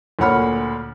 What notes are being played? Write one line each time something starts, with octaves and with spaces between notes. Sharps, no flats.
D2 A#2 C#5 F#5 B5 F6